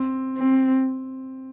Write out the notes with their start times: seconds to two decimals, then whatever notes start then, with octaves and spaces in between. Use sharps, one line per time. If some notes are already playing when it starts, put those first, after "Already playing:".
Already playing: C4
0.38 C4